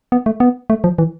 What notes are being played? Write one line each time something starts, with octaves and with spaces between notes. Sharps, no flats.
B3
A3
B3
A3
F3
E3